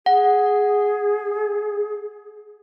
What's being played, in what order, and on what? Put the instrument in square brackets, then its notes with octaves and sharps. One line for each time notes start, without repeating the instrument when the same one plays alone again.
[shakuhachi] G#4 [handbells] F#5